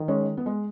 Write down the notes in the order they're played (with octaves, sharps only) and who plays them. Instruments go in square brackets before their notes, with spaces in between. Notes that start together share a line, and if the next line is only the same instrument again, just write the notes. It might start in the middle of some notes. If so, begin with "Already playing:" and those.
Already playing: [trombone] D#3
[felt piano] G#3 C#4
B3
G#3